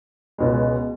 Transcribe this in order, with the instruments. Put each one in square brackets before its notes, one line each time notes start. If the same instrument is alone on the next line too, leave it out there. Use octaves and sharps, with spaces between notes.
[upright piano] C#2 B2 G#3